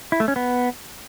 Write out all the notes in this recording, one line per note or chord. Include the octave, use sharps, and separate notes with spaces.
E4
A3
C#4
B3